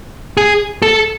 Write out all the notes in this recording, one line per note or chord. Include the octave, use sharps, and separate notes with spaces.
G#4
A4